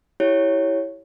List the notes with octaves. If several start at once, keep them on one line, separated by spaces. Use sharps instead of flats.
E4 G4 C#5